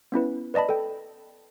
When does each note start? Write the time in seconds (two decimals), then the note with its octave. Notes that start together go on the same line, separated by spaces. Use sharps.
0.12 B3 C#4 E4 B4
0.54 B4 D5 D#5 A5 B5
0.69 A4 G5